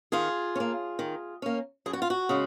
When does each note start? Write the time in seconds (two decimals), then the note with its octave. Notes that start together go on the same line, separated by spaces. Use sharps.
0.12 D#3 F4 G#4
0.55 C#4
0.60 A#3
0.99 D#3
1.42 A#3 C#4
1.86 F#2 G#4
1.93 F#4
2.02 F4
2.10 F#4
2.29 C#3 G#3